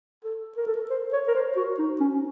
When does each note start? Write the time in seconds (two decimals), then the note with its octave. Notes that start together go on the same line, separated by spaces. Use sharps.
0.24 A4
0.57 A#4
0.67 A4
0.76 A#4
0.91 C5
1.13 C#5
1.28 A#4
1.35 C5
1.56 F#4
1.79 D#4
2.00 C#4